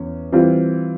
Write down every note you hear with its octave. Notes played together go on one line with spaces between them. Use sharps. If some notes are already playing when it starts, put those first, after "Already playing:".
Already playing: E2 C#4
E3 G3 C4 F4